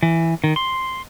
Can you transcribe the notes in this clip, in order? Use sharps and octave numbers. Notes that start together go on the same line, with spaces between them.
E3
D#3
C6